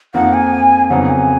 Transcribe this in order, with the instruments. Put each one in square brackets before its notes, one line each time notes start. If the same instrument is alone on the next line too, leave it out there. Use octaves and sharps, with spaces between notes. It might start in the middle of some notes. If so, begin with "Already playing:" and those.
[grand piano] F2 F3 A#3 D#4 [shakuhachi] F#5
[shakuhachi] G#5
[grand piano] F2 C#3 F#3 B3 D#4 [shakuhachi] F#5
[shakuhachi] G#5